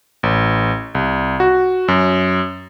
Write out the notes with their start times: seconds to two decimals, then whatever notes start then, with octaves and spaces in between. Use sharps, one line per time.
0.23 A1
0.95 C2
1.40 F#4
1.88 F#2